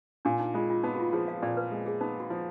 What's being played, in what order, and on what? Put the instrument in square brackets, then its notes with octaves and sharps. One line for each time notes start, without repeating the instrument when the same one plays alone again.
[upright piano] A#2 [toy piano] D4
[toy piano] D#4
[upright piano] G#3 [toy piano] F4
[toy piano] F4
[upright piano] B3 [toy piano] D#4
[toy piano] F#4
F4
[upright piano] F3 [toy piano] G#4
[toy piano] F5
[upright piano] A#2 [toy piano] D5
[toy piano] B4
[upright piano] G#3
[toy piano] G#4
[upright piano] B3 [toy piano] D#4
[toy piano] F#4
[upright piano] F3